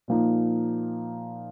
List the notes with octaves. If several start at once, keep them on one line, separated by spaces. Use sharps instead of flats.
A#2 F3 A#3 D#4